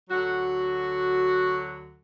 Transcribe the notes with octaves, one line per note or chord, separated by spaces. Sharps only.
D2 D3 F#3 F#4